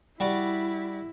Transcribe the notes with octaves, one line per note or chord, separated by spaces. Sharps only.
G3 E4 F#4 D5